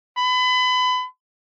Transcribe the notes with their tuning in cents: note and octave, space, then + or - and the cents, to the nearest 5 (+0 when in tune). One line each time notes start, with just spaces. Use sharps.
B5 +30